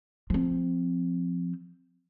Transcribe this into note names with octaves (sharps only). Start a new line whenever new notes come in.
F3 C4